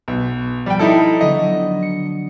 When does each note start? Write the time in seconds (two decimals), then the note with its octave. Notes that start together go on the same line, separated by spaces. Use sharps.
0.08 B1
0.66 F3 G3 G5
0.79 D#4 E4 A4
1.21 D3 F#3 B3 D#5
1.82 C#7